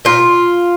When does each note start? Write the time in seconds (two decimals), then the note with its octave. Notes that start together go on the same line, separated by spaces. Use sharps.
0.05 A#2 F4